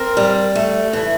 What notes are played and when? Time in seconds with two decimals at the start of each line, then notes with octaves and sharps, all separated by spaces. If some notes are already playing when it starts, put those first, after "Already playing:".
Already playing: C4 A#4
0.17 G3
0.56 A3
0.93 E3